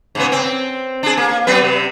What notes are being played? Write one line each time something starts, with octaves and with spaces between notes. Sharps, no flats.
G#2 C#3 B3
C4
D4 G#4
A#3
F#3 B3 B4
C3